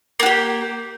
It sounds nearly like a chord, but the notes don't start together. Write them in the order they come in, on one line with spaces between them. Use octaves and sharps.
A#3 F#4 G4